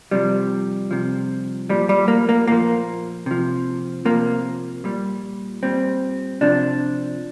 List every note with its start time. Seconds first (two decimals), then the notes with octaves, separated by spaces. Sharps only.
0.11 C3 F3 G3
0.91 C3 F3
1.69 A#2 F3 G3
1.89 G3
2.08 A#3
2.29 A#3
2.48 A#2 F3 A#3
3.26 C3 F3
4.05 C3 F3 A#3
4.84 A#2 G3
5.63 A#2 G3 C4
6.41 C3 F3 D4